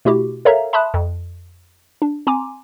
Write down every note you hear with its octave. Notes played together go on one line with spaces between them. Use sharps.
B2 A3 E4 F#4 G4
A4 A#4 C#5 E5 F5 A#5
E5 A5 B5 C6 D#6 F#6
F2
D4
C4 G#5 A#5 C6 D6